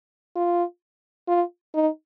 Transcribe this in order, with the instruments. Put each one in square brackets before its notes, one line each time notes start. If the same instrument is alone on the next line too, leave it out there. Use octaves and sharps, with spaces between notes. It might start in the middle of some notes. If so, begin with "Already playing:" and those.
[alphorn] F4
F4
D#4